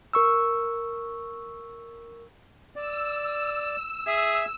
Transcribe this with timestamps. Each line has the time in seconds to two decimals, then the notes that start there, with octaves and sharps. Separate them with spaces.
0.13 A#4 C#6 E6
2.76 D5 E6
4.07 G#4 E5